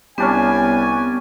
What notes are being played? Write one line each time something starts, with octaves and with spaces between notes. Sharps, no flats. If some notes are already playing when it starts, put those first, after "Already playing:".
C2 B3 C#4 D4 G4 G#5